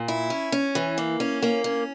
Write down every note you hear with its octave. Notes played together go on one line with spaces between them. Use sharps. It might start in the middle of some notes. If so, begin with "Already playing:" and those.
Already playing: A#2
E4
C#4
C#4
E3
A#3
C#4
A#3
C#4